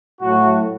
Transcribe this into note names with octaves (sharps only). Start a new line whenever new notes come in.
A2 F#3 A3 F#4